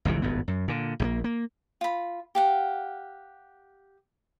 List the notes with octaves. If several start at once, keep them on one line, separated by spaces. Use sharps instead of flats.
G1 C#2 C3 E3
D#1 G#1 G2 B3
F#2
A#2 D3
A#1 F3 A#3
A#3
F4 B5
G4 F5 F#5